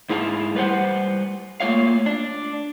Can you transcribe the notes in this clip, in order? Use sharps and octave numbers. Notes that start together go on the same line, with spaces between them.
G#2 E4 G#4 F5 A5
G3 B4 C5 F#5
A3 A#3 F4 C#5 F5
D4